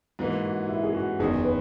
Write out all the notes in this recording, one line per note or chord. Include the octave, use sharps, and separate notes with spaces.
G#2 E3 A#3 F#4
F#4
E4
G#4
F#4
F#1 E2 D#3 G#4
B4